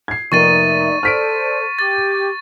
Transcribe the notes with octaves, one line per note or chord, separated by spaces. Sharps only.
G#6 C7
F1 A#3 D#4 D5 E5 C#6 A6 D#7
A4 C5 D5 F6 B6 D7
G4 D6 A6